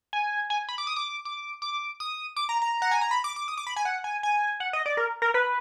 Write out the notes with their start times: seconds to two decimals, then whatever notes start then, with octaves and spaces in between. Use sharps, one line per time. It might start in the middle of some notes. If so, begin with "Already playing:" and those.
0.13 G#5
0.50 G#5
0.69 B5
0.78 D6
0.87 D#6
0.96 D6
1.25 D6
1.62 D6
2.00 D#6
2.36 D6
2.49 A#5
2.62 A#5
2.82 F#5
2.91 G#5
3.01 A#5
3.11 B5
3.24 D6
3.36 D6
3.48 D#6
3.57 D6
3.67 B5
3.76 G#5
3.85 F#5
4.04 G#5
4.23 G#5
4.60 F#5
4.73 D#5
4.86 D5
4.97 A#4
5.22 A#4
5.34 B4